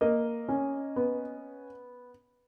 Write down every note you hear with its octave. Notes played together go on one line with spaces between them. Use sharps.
A#3 D#5
C#4
B3